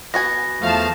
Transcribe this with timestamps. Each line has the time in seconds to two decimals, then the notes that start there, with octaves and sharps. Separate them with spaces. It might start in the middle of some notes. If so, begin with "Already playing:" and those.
0.14 B3 F#4 G#5 A#6
0.61 E2 F3 A3 F5 A5